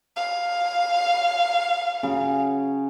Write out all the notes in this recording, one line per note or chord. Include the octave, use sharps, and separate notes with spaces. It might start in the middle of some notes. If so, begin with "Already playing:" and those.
F5
C#3 F#3